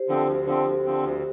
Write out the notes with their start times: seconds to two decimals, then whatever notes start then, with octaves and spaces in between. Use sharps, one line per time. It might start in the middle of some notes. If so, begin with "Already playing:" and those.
Already playing: G4 C5
0.08 D3 F3 C4
0.17 A4
0.27 D2 G4 C5
0.46 D3 F3 C4
0.66 D2
0.85 D3 F3 C4
1.04 D2